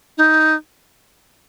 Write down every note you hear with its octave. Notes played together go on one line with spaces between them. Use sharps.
D#4